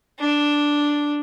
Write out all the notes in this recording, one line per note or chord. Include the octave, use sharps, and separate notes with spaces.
D4